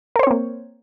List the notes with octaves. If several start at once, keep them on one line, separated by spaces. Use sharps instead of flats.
A#3 C4 A#4 C5 C#5